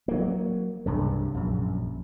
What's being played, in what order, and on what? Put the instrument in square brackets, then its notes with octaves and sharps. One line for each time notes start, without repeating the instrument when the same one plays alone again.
[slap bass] F#3 A#3
C2 G2 C#3
A#1 F#2